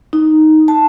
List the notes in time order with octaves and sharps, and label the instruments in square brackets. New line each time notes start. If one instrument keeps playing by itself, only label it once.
[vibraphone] D#4
A5